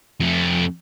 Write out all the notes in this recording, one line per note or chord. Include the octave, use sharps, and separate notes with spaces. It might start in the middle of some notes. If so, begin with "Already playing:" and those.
F2 A3